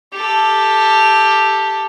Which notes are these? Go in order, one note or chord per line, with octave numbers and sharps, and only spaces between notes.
G4 A4